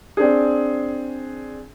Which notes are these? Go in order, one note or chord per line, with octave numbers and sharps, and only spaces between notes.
C4 D4 G#4